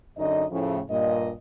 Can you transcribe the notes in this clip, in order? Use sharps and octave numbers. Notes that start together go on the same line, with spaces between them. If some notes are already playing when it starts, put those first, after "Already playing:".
F#2 D3 D#4 D#5
A2 C#3 F3
G2 A#2 D#5